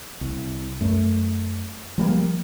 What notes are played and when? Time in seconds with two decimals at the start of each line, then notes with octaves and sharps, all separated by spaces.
0.21 C2
0.81 F#2 A3
1.98 F3 G3 A#3